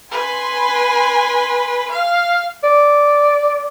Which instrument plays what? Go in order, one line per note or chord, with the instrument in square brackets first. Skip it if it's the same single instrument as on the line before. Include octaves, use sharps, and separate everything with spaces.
[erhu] B4 [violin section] G#5 C6
[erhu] F5
[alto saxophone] D5